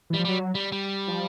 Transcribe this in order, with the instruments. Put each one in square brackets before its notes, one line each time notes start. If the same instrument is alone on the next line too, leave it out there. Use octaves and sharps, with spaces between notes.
[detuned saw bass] E3
[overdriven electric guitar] G3
[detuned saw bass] F3
[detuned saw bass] F#3 [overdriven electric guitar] G3
[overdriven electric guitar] G3
G3
[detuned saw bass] F3